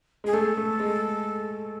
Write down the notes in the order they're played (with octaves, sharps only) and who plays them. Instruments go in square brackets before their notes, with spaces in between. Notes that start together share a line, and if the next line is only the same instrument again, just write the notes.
[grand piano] G#3 [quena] G#4
[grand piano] A3 [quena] A4
[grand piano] A3
G#3